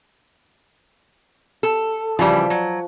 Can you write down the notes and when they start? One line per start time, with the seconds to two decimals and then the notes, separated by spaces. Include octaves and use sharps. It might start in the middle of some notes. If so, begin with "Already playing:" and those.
1.63 A4
2.19 C#3 E3 F3 G3
2.50 F#3